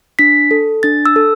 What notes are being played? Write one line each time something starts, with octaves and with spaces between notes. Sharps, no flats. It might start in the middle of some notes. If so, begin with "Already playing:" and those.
D4 B6
A4
D4 A6
E6
A4